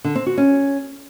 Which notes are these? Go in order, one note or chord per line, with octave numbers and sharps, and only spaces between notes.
D3
C4
F#4
C#4